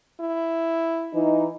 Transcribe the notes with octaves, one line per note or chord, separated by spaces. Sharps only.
E4
E3 D#4